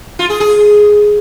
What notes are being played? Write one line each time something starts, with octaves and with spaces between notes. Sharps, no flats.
F4
G#4
G#4